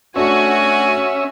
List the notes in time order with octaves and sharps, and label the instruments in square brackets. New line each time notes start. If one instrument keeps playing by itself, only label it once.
[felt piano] A3 D4 [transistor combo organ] C#4 E5 [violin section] F#4 [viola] G#5